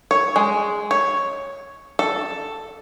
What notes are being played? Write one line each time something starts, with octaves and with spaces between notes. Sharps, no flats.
C#5
G#3
C#5
A4